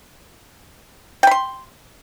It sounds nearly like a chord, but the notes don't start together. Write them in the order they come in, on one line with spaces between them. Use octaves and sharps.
G5 B5 C6